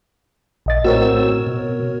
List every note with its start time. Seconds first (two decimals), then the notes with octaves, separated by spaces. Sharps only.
0.66 A#1 D#5 A6
0.84 A2 C4 F#4 A#4 C#5 E6
1.46 B2